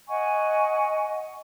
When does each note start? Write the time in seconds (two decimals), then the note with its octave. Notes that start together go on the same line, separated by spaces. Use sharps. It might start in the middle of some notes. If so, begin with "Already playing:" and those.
0.09 D#5 F#5 G#5 C#6